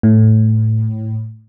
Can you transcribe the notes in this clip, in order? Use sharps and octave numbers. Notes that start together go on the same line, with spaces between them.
A2